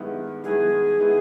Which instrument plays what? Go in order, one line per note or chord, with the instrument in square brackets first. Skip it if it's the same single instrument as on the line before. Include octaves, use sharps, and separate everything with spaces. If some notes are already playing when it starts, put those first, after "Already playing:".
Already playing: [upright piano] G2 D#3 G#3 B3 E4
[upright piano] G2 D#3 G#3 B3 E4 [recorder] G#4
[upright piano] D#3 G#3 B3 E4